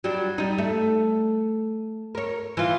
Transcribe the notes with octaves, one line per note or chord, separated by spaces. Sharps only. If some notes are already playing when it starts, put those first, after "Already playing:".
F#3 G3 D4
G3 D#4
A3
A#4 C#5
E3 F4